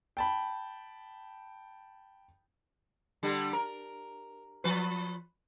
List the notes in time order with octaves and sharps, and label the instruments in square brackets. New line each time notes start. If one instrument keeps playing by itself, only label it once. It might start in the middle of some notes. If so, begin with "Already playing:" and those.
[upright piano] G5 A5 B5
[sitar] D3 G3
A#4
F3 B4